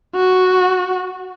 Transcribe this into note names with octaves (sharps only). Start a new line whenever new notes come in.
F#4